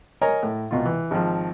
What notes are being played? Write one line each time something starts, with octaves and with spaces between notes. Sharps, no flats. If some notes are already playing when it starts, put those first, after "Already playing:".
A#4 C#5 D#5 G#5 A#5
A2
C2 B2 F4
E3
G#1 F3